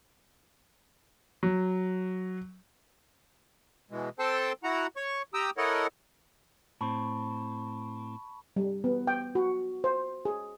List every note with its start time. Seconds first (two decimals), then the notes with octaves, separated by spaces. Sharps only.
1.43 F#3
3.91 B2 E3 G#3
4.19 C4 A4 C5 G5 A5 C6
4.64 E4 F#4 F#5 A#5
4.96 C#5 C#6
5.34 G4 G5 A#5 D#6 E6
5.57 E4 A4 A#4 C#5 D#5 F#5
6.81 A2 C4 A5 B5 C#6
8.56 G3
8.84 B3
9.07 G5
9.35 F#4
9.84 C5
10.25 G#4